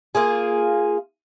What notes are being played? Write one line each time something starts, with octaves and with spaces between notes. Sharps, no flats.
A#3 F4 G#4